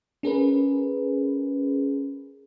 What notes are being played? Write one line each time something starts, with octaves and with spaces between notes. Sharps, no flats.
C#4 G#4 A#4 B4